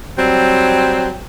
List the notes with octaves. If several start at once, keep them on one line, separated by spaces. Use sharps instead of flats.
F#3 G3 C4